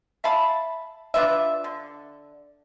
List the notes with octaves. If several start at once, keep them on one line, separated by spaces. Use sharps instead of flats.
E5 F5 A5 B5
D4 F4 B4 E5
D3